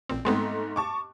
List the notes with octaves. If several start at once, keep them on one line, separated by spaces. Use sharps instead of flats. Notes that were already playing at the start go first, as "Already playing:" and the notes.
A1 A#2 C4
G#2 G#3 A3 B3 C4 C6
A5 C#6 D6